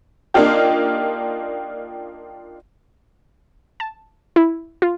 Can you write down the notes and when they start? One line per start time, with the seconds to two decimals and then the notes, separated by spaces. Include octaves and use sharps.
0.34 A#3 D4 D#4 F4 G4
3.80 A5
4.36 E4
4.82 F4